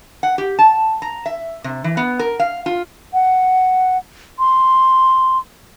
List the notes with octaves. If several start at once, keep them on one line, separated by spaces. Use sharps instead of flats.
F#5
G4
A5
A#5
E5
C3
E3
B3
A#4
F5
F4
F#5
C6